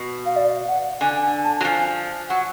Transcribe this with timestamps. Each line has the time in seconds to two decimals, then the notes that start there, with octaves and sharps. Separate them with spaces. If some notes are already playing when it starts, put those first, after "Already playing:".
Already playing: B2
0.26 F5
0.36 D5
0.68 F#5
1.01 D3 G#5
1.22 G#5
1.44 A5
1.61 F#3
1.65 F3 G#5
2.29 F#3 F#5